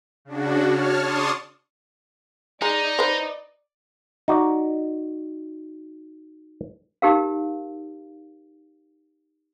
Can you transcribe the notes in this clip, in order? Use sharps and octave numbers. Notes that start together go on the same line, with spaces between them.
C#3 D4 F#4
C#5 A5 F6
D5 A5 C6 C#6 D#6
G#3 D#4 D5 D#5 A#5
B4 C5
D#4 F#4 D5
D#4 G4 A#4 F5